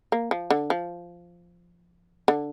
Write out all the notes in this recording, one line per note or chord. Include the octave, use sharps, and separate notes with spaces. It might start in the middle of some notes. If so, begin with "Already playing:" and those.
A#3
F3
D3
F3
D3